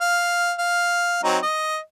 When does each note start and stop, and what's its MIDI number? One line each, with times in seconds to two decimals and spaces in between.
0.01 0.53 77
0.58 1.19 77
1.23 1.38 54
1.23 1.38 60
1.23 1.38 63
1.43 1.78 75